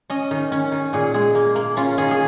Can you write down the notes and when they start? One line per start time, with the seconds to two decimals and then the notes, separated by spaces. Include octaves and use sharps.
0.10 C#4 D#5
0.31 D#3
0.52 C#4
0.72 D#3
0.93 A#2 G#4
1.14 G#3 G#4
1.35 A#3
1.55 A#3
1.77 C#4 F4
1.98 D#3 G#4
2.11 G#4